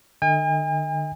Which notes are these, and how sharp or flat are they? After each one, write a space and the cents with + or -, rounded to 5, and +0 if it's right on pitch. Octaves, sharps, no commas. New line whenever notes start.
D3 +45 D#5 +40 G#5 -45